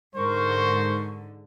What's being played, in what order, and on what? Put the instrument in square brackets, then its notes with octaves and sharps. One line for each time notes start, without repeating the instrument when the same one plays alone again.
[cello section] G#2 D3 [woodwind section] A#4 C#6 [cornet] C5